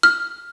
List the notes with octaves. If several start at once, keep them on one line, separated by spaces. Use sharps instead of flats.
F6